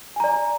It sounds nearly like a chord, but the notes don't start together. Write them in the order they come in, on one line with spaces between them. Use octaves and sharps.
G#5 A#5 D5